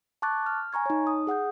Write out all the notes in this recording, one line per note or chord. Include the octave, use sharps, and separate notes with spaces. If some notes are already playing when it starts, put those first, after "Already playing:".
A5 C#6 D6 F#6 A6
F6
G#5 A#5 C#6 G#6
D#4 C#5
D#6
G#4 F#5 D#6 G6